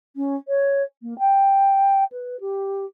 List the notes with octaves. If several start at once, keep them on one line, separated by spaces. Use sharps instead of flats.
C#4
C#5
A#3
G5
B4
G4